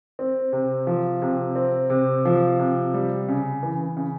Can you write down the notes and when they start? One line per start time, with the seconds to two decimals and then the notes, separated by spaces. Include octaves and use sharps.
0.19 C4
0.53 C3
0.87 F3
1.22 C3
1.56 C4
1.90 C3
2.25 F3
2.59 C3
2.94 G3
3.29 C#3
3.63 E3
3.97 C#3